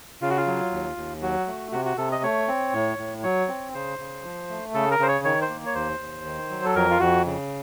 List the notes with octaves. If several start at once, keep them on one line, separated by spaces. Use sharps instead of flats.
C#3 F4
F#4
F4
F#3
D#2
D#2
F#3 F#4
A3
C3 F#4
F#4
C3 A4
D#5
A3 C#5
C4
A2
A2
F#3 C#5
C4
C#3 C5
C#3
F3
A3
C#3 A4
A#4
C#3 C5
C#5
D#3 C#5
C5
A#3
C#5
D#2 C5
D#2
D#3
F#3
A4
F2 A#4
F4
F2 F#4
C#3